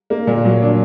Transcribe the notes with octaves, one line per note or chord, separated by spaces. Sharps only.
A#3
A#2
F#3
D4